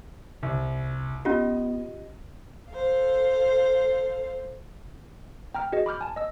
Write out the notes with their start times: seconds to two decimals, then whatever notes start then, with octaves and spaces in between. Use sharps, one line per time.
0.43 C2
1.25 B3 C#4 F4 G4 D#5
2.71 A4 C5 F5
5.55 G5 A#5 F6
5.72 F#4 G#4 D#5
5.86 B5 D6 F6 G6
6.01 G#5 A5
6.16 D#5 E6